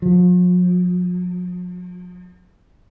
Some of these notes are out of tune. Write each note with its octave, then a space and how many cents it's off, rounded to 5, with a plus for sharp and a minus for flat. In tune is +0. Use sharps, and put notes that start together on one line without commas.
F3 +45